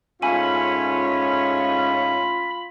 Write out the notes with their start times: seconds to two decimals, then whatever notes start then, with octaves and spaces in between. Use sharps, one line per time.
0.22 G#2 A3 C#4 F4 F5 G#5 B5 D#7